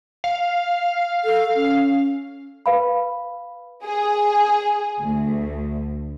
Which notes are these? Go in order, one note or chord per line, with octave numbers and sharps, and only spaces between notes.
F5
A4
C#4
B4 F5 B5
G#4
D2